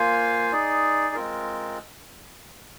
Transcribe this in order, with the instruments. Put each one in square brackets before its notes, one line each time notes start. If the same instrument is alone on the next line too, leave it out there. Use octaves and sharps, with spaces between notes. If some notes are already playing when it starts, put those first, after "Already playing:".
Already playing: [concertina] A#3 F4 C5 F5 G#5
D#4 G#4 D5
G#3 C4 F4 A#4